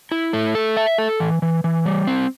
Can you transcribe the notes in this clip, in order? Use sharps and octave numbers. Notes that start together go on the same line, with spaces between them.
E4
A3
A4
E5
A4
E3
E3
E3
G3
C4